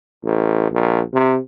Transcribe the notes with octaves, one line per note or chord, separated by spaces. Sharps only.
A1
A#1
C3